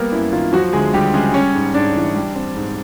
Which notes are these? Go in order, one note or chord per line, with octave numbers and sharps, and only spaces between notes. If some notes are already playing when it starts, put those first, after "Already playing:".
Already playing: G3 A#3 B3 A#4
F#2 E4
D#3 F4
F3 F#3 F#4
D2 G#3 G#4
D2 G3 G4
C#3 G#3 G#4
G3 C#4 C#5
G#2
G#2 D4 D5
E3
G3
C4
G#2